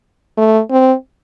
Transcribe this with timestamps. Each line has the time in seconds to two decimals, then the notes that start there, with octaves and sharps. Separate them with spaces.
0.37 A3
0.71 C4